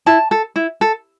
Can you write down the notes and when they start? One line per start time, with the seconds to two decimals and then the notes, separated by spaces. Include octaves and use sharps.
0.06 E4 A5
0.31 A4
0.56 E4
0.81 A4